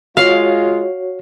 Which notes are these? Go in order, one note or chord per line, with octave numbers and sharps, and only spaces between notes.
G#3 F4 F#4 C#5 F5